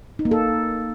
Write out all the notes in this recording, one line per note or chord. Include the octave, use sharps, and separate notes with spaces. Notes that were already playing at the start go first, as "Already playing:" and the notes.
D#4
A#3
A4